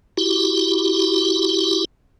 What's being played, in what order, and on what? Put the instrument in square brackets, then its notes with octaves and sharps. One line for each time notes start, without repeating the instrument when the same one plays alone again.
[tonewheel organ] E4 F#4 G4